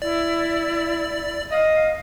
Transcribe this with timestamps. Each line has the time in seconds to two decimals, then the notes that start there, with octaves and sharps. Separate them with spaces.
0.02 E4 D5
1.51 D#5 F5